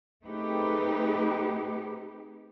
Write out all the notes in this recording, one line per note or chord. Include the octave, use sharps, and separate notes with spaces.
A3 C4 D#4 G4 G#4 B4